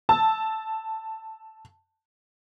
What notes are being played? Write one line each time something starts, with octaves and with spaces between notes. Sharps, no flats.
A5 E6